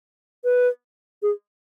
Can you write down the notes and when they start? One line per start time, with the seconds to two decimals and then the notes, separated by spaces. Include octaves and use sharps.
0.44 B4
1.23 G#4